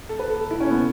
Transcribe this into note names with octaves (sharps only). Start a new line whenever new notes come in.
A4
B4
A4
A4
E4
C#4
B3